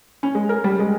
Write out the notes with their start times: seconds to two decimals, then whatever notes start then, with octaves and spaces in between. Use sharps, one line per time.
0.23 C#4
0.35 G#3
0.49 A#4
0.64 G3
0.79 G#3